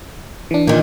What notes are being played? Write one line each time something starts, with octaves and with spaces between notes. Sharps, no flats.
E3 D4
A#2 D#3